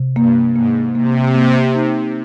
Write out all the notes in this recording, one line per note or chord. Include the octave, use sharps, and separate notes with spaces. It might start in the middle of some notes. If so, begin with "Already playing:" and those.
Already playing: C3
G2 A#3
G#2 A#3
C3 A#3
A#3
D#4